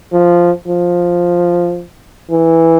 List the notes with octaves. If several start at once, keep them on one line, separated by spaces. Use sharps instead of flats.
F3
F3
E3